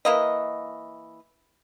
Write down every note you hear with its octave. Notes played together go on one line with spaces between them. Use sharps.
E3 A#3 D#5